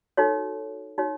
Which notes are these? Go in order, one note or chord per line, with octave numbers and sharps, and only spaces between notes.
D#4 F#4 A4 C#5
D#4 F#4 C#5